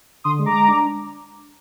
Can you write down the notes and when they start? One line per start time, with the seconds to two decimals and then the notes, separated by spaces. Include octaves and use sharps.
0.24 D3 C6 D#6
0.39 G#3
0.46 A#5 D6
0.53 G#3
0.68 D4